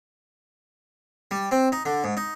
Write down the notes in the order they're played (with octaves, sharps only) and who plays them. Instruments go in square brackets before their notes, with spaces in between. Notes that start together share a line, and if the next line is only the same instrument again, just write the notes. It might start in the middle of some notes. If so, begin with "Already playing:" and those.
[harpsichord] G3
C4
D#4
D3
G#2
D#4